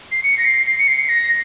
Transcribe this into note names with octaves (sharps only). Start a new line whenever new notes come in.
C7
C#7
A#6
C7
C7
C#7
C7
A#6